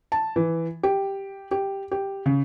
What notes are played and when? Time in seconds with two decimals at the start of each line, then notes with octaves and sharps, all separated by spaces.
0.12 A5
0.36 E3
0.83 G4
1.51 G4
1.91 G4
2.26 C#3